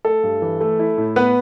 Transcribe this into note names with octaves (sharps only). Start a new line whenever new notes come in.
A3 A4
G2
E3
A3
E4
A2
B3 B4